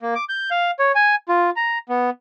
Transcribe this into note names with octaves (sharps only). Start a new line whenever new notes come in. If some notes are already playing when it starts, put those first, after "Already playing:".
A#3
D6
G6
F5
C#5
G#5
F4
A#5
B3